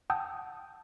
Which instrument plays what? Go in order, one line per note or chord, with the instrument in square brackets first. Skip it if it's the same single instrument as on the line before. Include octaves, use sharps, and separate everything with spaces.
[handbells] F#5 G5 A5 D#6 E6 G6